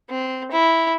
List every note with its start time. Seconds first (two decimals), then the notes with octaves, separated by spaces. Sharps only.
0.10 C4
0.51 E4